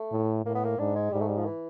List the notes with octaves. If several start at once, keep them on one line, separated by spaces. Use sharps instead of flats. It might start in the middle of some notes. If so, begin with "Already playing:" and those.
Already playing: A3
A2
A2 A#3
B3
A#3
G#2 D4
G#3
G#2 G3
A3
G3
F3
E3